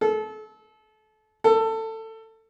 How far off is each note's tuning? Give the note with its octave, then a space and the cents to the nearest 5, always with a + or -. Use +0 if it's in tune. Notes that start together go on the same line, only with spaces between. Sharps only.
A4 -30
A4 +20